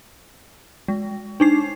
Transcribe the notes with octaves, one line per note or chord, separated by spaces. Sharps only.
G#3
D4 D#4 C7